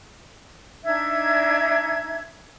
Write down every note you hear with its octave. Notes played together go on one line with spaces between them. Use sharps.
D4 D#4 E5 G#6